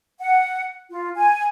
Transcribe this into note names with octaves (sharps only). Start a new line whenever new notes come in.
F#5
F4
G#5